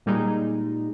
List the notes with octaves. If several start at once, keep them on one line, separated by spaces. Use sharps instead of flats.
A#2 G3 G#3 D#4